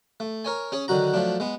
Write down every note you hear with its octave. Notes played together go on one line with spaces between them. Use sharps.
A3
A#4 C#5 G#5
C#4 G#4 C#5
D3 D#3 F#3 F#4 A#5
F3 F#3 A3 D4
G#3 B3